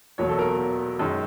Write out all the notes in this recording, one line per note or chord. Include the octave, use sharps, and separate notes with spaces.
E2 B2 F#3 A#3 C#5
A4
A#4
F#2 D#3 G#3